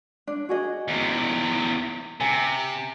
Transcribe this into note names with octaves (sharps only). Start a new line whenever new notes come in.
D4
F#4 G#4 D#5
E2 C3
C3 G#5